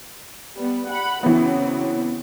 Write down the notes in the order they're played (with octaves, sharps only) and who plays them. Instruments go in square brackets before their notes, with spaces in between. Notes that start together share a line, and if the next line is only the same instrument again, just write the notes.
[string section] G3 B3
F#5 B5
[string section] C#3 F#3 C4 [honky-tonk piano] E3 B3